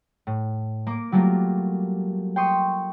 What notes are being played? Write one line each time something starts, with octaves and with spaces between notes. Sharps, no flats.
A2
A#3 D6
F#3 G3 A3 A#3 F4
G5 C6 C#6 D#6